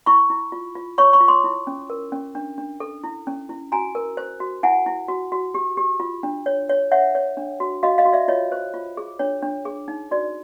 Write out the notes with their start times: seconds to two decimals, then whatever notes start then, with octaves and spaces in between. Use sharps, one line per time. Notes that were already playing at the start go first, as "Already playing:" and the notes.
0.06 E4 B5 C#6
0.30 E4
0.52 F4
0.75 F4
0.98 C#5 B5 C#6
1.13 B5 C#6
1.21 F4
1.28 C6 D6
1.44 E4
1.67 C#4
1.90 A#4
2.12 C#4
2.35 D4
2.58 D4
2.80 A4
3.04 E4
3.27 C#4
3.49 E4
3.72 F#4 G#5 A#5
3.95 A#4
4.17 C5
4.40 F#4
4.63 E4 F#5 G#5
4.86 E4
5.08 F#4
5.32 F#4
5.55 G4
5.77 G4
6.00 F4
6.23 D4
6.46 C#5
6.69 C#5
6.91 C#5 E5 F#5
7.15 C#5
7.37 D4
7.60 F#4
7.83 F#4 D#5 F5
7.98 D#5 F5
8.05 F#4
8.13 D5 E5
8.28 F4 C#5 D#5
8.52 C5
8.74 F4
8.97 G#4
9.19 D4 C#5
9.43 D4
9.65 G#4
9.88 D#4
10.11 F#4 D5